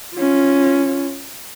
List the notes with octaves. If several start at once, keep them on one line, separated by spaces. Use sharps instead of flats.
C#4 F4